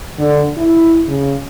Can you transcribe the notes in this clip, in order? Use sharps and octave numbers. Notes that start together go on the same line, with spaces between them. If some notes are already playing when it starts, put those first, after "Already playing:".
D3
E4
C#3